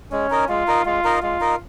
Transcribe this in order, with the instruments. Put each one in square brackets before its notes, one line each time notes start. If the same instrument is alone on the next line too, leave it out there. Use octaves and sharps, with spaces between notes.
[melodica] G#3 [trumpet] C#4
[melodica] D#4 A#4 D#5
[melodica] G#3 [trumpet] F4
[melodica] D#4 A#4 D#5
[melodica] G#3 [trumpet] F4
[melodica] D#4 A#4 D#5
[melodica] G#3 [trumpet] F4
[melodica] D#4 A#4 D#5